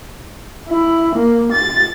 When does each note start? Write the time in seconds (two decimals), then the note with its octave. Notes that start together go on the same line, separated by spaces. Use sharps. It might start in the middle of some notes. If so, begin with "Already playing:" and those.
0.70 E4
1.16 A#3
1.52 A6